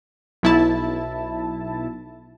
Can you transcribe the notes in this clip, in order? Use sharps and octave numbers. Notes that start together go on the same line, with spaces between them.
B1 E4 A5